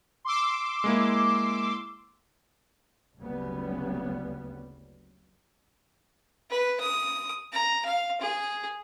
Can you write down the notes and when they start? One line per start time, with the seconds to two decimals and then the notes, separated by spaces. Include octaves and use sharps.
0.25 C6 D6 E6
0.84 G#3 A#3 E4
3.18 F#1 D2 C#3 G3 B3
6.50 B4
6.80 D#6
7.52 A#5
7.86 F5
8.21 G#4